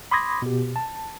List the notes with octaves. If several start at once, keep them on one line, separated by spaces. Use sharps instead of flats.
B5 C6 D6 D#6 G#6 A#6
B2 G4
A5